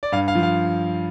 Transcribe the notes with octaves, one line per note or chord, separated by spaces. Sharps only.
D5
G2 F5
F5
F3
F5